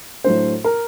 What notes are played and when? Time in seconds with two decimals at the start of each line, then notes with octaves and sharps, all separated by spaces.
0.24 A2 F#3 A3 D4 C5
0.64 A#4